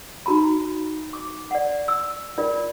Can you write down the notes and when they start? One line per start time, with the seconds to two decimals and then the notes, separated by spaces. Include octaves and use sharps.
0.26 D#4 F#4 A#5 B5
1.13 D6
1.51 D5 F#5
1.88 E6
2.38 F4 A#4 D5